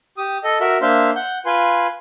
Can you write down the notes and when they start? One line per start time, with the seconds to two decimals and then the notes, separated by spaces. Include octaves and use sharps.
0.18 G4 D#6
0.44 A4 D#5
0.60 F#4 A#4 E5
0.82 A#3 D4 C5 E5 F5 C6
1.16 F#5 G6
1.46 F4 B4 G#5 C6